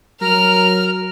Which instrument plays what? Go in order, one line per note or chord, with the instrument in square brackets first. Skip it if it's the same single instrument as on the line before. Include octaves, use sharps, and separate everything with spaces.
[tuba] F#3 [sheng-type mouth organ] A#4 A#5 [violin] F6